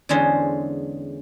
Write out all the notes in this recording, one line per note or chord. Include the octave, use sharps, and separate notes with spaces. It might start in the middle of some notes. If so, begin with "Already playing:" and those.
E2 D3 G#3 C#4 C5